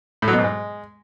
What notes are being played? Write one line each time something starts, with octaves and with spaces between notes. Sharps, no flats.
A2
F#3
B2
G#2
G#3